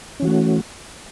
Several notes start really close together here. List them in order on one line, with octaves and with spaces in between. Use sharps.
C#4 E3 F#4 A3